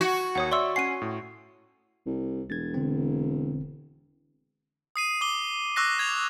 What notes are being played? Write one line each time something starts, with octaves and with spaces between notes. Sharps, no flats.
F#4 G#6
D#2 C#5 F#5 D#6
D5 E5 C6 C#6 E6
C#4 F#5 G#5 C7 D#7
A2
C2
E1 G#6 A6
D3 C4
D#6 C7 D#7
D6 G7
C#6 D6 E6 F#6 A#6 C7
G#6 F7